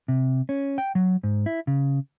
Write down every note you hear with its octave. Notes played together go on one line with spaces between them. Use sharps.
C3
C#4
G5
F#3
G#2
E4
C#3